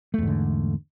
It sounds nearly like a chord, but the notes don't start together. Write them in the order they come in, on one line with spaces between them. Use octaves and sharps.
A3 E2 G#2 D3